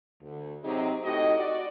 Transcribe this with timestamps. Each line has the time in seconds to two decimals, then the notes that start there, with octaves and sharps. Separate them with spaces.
0.22 D2
0.64 C3 F#3 C4 D#4 G4 G#4
1.04 A2 D#4 F#4 G4 D#5
1.37 F#4 D5